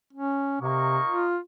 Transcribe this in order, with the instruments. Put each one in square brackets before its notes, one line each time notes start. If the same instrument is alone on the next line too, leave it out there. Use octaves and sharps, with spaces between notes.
[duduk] C#4
[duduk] C3 [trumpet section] A#3 D#4 C#6
[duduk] F4